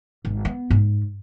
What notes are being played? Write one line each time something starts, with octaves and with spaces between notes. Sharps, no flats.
G#1
B3
G#2